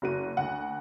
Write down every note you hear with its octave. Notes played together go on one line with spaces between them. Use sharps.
F#1 F#4 D#7
D2 F#5